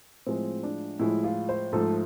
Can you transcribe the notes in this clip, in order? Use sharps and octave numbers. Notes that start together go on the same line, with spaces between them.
A2 F3 G#3 C4
D4
A2 F3 G#3 E4
F4
C5
G#2 F3 A3 A4